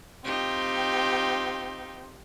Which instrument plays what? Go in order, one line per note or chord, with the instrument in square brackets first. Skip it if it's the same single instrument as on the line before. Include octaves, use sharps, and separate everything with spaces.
[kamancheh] C4 [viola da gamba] D#4 F4 G4